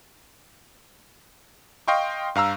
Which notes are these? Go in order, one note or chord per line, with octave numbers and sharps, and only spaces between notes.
D#5 F5 G5 C6 C#6
G2 F5 A#5 E6